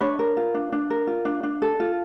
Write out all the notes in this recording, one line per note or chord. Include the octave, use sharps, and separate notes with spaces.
D4 B4 C#5
A#4
F4
D4
D4
A#4
F4
D4
D4
A4
F4